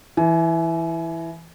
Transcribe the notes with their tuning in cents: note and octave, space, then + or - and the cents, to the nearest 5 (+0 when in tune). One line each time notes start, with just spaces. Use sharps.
E3 +0 G#5 +30